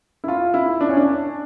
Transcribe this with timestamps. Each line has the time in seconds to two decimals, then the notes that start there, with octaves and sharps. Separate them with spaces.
0.24 E4
0.28 F4
0.54 E4
0.81 D4
0.89 C#4
0.97 D4